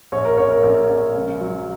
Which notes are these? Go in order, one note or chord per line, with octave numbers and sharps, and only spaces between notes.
A#1 C#5
A#4
A#1 C#5
A#4
A#1 A#4
A#1
C#2
F#3